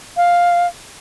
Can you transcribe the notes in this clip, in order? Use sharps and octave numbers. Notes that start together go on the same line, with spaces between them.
F5